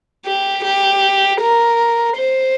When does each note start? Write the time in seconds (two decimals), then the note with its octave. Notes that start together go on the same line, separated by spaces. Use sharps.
0.26 G4
0.64 G4
1.41 A#4
2.16 C5